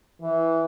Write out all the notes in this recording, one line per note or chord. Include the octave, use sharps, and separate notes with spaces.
E3